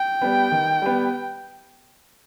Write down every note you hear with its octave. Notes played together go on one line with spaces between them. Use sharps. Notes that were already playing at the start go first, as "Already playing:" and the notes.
Already playing: G5
G3 B3
D#3
G3 B3